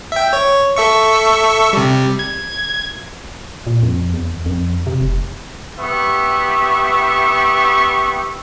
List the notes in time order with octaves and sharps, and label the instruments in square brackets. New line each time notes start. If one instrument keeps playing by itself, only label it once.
[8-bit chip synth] E5 G5
C#5
A4 E5 C#6
C3 G3
G#6
[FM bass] A#2
F2
E2
F2
C3
F1
[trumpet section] B3 G4 E5 C#6